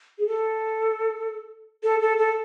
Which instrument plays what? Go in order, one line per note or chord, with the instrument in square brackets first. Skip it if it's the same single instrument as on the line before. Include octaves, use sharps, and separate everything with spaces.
[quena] G#4
A4
A4
A4
A4